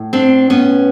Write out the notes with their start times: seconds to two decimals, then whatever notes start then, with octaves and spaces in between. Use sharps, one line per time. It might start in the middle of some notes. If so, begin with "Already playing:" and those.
Already playing: A2
0.13 C4 D4
0.50 B3 C#4